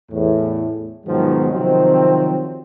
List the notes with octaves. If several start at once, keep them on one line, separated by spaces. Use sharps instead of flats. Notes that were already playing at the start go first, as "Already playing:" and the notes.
E2 A2
G#2 B2 D#3 F3 F#3 B3
C3 D#3 F3 F#3 C4